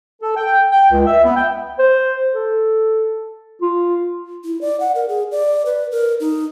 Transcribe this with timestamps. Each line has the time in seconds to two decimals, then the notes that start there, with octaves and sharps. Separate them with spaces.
0.22 A4
0.36 G5
0.72 G5
0.91 C#2
1.06 E5
1.24 B3
1.36 G5
1.79 C5
2.33 A4
3.62 F4
4.45 E4
4.61 D5
4.80 F#5
4.95 A#4
5.08 G#4
5.31 D5
5.65 B4
5.91 A#4
6.20 D#4